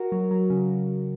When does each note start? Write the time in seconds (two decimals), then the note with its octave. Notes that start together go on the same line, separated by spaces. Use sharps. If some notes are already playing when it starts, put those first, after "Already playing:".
Already playing: F#4 A#4
0.12 F#3
0.31 F#3
0.50 C#3